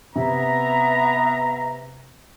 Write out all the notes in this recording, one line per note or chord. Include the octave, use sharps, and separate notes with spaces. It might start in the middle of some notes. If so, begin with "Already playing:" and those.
C3 B3 E5 A#5